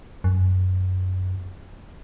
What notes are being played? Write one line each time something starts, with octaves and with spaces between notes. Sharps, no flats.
F#2